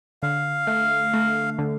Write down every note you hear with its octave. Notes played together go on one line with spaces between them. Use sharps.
D3 F5
A3
A3
D3